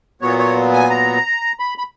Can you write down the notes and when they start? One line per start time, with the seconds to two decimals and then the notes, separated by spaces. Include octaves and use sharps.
0.22 A#2 F#3 B3 C#5
0.39 C#5
0.74 G#5
0.90 A#5
1.60 B5
1.78 B5